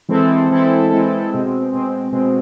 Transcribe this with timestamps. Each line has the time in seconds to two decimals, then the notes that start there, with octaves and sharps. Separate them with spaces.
0.09 E3 G#3 C4 E4 A4
0.49 E3 G#3 C4 E4 A4
0.89 E3 G#3 C4 E4 A4
1.30 B2 G#3 C4
1.72 B2 G#3 C4
2.12 B2 G#3 C4